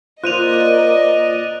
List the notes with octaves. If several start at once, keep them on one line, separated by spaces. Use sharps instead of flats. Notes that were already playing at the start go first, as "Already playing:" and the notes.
A#3 F4 C5 D5 D#5 F#6 D#7 F7